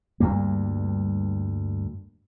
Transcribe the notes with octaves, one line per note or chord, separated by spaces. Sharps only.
D2 G2 G3 A#3